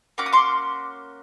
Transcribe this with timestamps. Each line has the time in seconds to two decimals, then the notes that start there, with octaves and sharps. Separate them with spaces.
0.18 A#3 C#4 F#4 D6
0.26 D#6
0.33 C6 D6